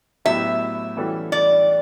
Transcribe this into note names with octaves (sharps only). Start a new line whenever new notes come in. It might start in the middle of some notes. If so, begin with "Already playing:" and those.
A2 F#3 B3 E4 G4 E5
E3 G3 C#4 F#4 A4
D5